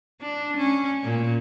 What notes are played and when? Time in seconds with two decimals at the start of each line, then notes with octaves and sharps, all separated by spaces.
0.21 D4
0.57 C#4
1.04 A#2